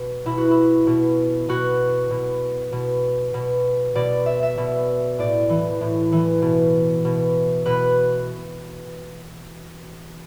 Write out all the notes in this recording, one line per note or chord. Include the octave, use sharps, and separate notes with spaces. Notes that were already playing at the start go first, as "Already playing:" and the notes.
Already playing: B2
B2 E4
F#4
E4
B2
B2 F#4
B2
B2
B2
B2 D5
E5
E5
B2
A2 D5
E3
A2
E3
B2
B2
B2 B4